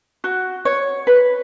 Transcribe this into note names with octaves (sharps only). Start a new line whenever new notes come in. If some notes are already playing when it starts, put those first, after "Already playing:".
F#4
C#5
B4